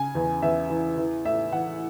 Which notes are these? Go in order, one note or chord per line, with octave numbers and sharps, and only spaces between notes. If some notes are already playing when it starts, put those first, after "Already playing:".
Already playing: C#3 G#5
E2
E2 E5
E3
E3
A2 E5
E3 F#5